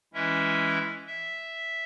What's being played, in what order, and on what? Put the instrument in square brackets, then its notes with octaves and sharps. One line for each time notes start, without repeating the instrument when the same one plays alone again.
[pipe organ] E3 G#3 C#4 E4 E5
E5